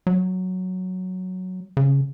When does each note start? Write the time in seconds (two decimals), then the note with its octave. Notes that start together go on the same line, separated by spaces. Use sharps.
0.07 F#3
1.77 C#3